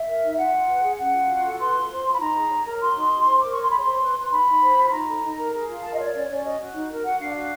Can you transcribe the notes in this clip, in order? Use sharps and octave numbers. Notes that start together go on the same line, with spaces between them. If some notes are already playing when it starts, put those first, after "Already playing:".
Already playing: E5
A#4
D#4
F4 F#5
F4
B4
G#4
C#4 F#5
F4
F#4
A4
B4 C6
F4
C5
F4
B5
D#4 A#5
G#4
C#5
A#4
F#4 C6
D#4
G#4
C5
A#4 D6
C#6
C#5 C6
G#4 B5
C6
C5
B4
B4
D#4 B5
D#4
C5
F4
D#4 A#5
A4
D#4
A#4
G#4
F4
A#4 A5
D#5
C#5 D5
C#4 D5
C#5
C#4
D5
F#4 D#5
F#4
D#4
A#4
F#4 F#5
D4 F5
F#4 F5